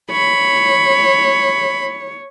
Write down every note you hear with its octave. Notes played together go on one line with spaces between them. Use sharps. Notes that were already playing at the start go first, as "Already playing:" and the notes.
C#5 B5